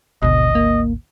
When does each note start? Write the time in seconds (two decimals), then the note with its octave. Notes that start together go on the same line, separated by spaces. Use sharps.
0.22 G#1 D2 B2 D#5
0.55 A#3